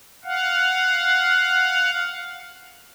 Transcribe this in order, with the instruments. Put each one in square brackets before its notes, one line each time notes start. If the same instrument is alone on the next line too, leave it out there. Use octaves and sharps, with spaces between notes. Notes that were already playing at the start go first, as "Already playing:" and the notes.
[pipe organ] F5 F#5